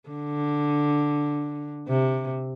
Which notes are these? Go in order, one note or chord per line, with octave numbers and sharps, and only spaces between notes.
D3
C3